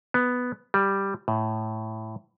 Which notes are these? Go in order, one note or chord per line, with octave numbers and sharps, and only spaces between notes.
B3
G3
A2